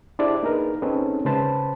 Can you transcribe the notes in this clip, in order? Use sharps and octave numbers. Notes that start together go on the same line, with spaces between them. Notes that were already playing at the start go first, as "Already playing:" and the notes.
D4 E4 G4 G#4 C5 D5
A#3 D#4 G#4 A#4 B4
C4 C#4 D#4 G#4 A4 B4
C#3 G#3 B4 C5 A5 B5